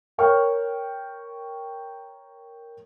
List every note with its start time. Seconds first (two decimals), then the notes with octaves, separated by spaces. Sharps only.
0.18 A#4 C#5 G5 C#6 F6